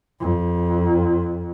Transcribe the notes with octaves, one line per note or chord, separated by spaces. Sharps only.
F2